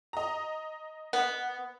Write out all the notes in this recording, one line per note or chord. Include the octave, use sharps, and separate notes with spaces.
D#5 A#5
B3